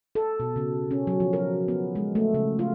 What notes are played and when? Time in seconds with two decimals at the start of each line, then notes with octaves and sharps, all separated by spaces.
0.15 A4
0.40 B2
0.56 C#3
0.91 C#4
1.07 F#3
1.20 F3
1.33 A#4
1.68 B3
1.95 G#3
2.15 A3
2.34 C#3
2.59 F4